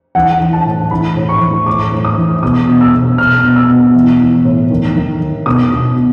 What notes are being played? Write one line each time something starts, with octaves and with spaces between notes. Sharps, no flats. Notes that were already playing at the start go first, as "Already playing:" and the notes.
E3 F#5
E3
A5
A2
E3 B5
A2
C#6
E3
A2 D6
A2
D#6
E3
B2 D#6
B2
E6
B2
B2 F6
B2
E6
B2
E3
E3
A2
D#3
D#3
D#3
B2 D#6
B2
B2